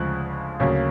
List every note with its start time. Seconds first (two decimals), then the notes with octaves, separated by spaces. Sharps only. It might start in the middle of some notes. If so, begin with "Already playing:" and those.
Already playing: D2 C#3 F3 G#3 F#6
0.60 D2 C#3 F#3 A#3 C#4